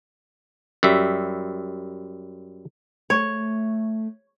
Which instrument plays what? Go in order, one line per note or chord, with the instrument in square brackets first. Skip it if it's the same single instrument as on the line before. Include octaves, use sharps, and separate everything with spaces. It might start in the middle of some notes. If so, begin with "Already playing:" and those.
[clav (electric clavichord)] F#2 G3 E5
[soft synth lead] A3 [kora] C#5